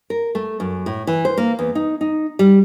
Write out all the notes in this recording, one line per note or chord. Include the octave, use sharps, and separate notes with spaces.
A#4
A3
F#2
A2
E3
C5
A#3
E2
D#4
D#4
G3